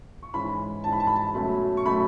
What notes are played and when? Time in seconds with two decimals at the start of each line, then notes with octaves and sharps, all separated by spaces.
0.23 C#6
0.34 G#2 E3 G#3 C#4 B5
0.84 G#2 E3 G#3 C#4 A5
0.92 B5
1.00 A5
1.07 B5
1.16 A5
1.34 B2 F#3 A3 C#4 B5
1.77 C#6
1.85 B2 F#3 A3 C#4 B5